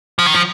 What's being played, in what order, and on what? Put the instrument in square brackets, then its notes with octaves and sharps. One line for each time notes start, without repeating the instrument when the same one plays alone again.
[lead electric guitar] F3
D#3
F3